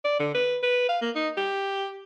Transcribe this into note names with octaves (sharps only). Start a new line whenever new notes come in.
D5
D3
B4
B4
F5
A#3
D#4
G4